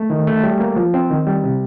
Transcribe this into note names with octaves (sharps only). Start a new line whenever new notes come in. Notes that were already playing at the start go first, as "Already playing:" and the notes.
Already playing: A3
D#3
A3
G3
A#3
F3
C4
D#3
G3
C3